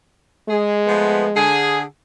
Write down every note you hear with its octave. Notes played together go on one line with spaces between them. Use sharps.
G#3 G#4
F3 A3 B3
D3 G#4